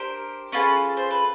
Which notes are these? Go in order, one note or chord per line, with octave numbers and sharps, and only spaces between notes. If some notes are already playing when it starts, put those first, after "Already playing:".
Already playing: D4 G4 A#4 C5
C#4 F4 G#4 A4 B4
C5
B4